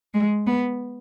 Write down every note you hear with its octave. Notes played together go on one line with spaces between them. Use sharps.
G#3
B3